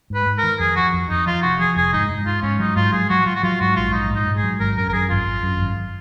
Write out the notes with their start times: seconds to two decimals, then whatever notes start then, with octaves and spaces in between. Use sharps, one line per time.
0.10 G#2 B4
0.26 G#2
0.38 D#3 A#4
0.60 F2 G#4
0.76 F3 F#4
0.93 F2
1.10 F2 D#4
1.26 F3 F4
1.43 F1 F#4
1.59 F3 G#4
1.76 F1 G#4
1.93 G#2 D#4
2.10 G#2
2.26 G#2 F4
2.43 G#2 C#4
2.59 F#3 D#4
2.76 G#2 F4
2.93 F#3 G#4
3.10 F#3 F#4
3.26 F#3 F4
3.36 F#4
3.43 F#3 F4
3.60 G#2 F#4
3.76 A#1 F4
3.93 G#2 D#4
4.10 G#2
4.15 D#4
4.27 G#2
4.37 G#4
4.44 F#3
4.60 G#1 A#4
4.77 F#2 A#4
4.89 A#4
4.93 F#2 G#4
5.10 G#1 F4
5.27 G#1
5.43 F#2
5.60 G#1